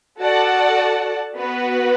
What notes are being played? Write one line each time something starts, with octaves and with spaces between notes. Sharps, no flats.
F#4 A4 D5 F#5 A5
B3 F#4 B4